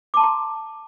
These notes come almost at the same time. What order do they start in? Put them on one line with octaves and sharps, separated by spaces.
D6 A5 C6 A#5